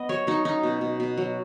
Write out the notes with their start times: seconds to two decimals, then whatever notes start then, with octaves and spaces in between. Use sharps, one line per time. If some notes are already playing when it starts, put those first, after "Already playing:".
Already playing: B3 D#5
0.09 F#3 C#5
0.27 F#3 D#4
0.45 C#4 D#4
0.63 B2
0.81 B2
1.00 B2
1.17 F#3